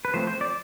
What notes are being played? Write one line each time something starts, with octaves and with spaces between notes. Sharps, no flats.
B4
F3 A3 C4 C5
C5
D5